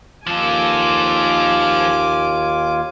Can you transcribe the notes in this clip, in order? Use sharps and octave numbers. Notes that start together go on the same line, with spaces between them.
D#2 F3 F4 A4 G#5 D6